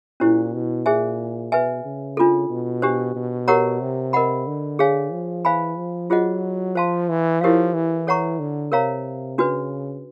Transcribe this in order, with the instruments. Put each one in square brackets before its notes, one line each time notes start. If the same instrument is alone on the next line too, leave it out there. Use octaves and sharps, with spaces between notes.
[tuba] A#2 [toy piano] C#4 E4 G4 C5
[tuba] B2
[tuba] A#2 [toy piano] G#4 C5 E5 G#5
[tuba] B2 [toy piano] B4 E5 G#5
[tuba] C#3
[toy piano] D4 F4 A4
[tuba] B2
[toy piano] D4 G4 C5
[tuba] B2
[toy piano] G4 A#4 C#5 F#5 A#5
[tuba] C3
[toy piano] A#4 D#5 F#5 B5
[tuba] D3
[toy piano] G#4 C#5 F5 G#5
[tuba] F3
[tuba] E3 [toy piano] C5 F5 G#5 B5
[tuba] F3
[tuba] F#3 [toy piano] F4 G#4 C5 D#5 F#5
[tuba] F3 [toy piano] C5 F5 A5 C6
[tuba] E3
[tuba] F3 [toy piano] E4 G4 A#4 C#5 F5
[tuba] E3
[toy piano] A4 C#5 F#5 A#5 C#6
[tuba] D3
[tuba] C3 [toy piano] A#4 C#5 F5 A#5
[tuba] C#3 [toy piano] D4 F#4 B4